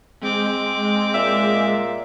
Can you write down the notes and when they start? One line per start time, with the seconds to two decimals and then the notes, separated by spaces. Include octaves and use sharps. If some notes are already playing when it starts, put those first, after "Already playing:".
0.23 G#3 C4 D6
1.14 A#2 E5